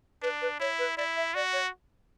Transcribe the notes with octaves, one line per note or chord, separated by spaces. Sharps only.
D4 B4
B4
E4 C#5
B4
E4 D5
E5
F#4 D5
C#5